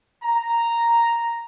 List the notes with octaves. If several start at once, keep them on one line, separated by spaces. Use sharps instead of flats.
A#5